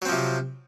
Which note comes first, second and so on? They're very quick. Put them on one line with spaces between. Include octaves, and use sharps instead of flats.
F#3 C4 F3 C3